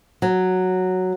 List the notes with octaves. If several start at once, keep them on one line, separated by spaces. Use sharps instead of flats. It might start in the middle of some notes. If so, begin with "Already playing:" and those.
F#3